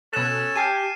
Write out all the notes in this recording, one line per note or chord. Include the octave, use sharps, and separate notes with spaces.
B2 C#4 A4 F#6 E7
G4 G#5 A5 F6 C7 D#7